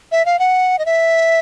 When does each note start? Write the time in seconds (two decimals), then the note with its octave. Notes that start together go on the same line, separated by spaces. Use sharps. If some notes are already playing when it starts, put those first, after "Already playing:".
0.12 E5
0.26 F5
0.39 F#5
0.79 D#5
0.86 E5